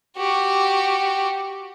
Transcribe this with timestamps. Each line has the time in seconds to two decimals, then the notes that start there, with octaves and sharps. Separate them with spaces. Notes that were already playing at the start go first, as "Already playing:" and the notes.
0.17 F#4 G4